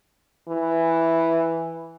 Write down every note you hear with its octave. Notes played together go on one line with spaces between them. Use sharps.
E3